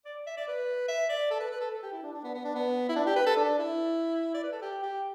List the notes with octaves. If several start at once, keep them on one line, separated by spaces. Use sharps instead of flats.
D5
E5
D5
B4
E5
D5
A4
B4
B4
A4
A4
G4
E4
D4
D4
B3
B3
D4
B3
E4
D4
G4
B4
A4
D4
E4
D5
B4
A4
G4
G4